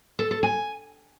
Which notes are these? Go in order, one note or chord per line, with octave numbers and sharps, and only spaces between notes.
A4
A4
G#5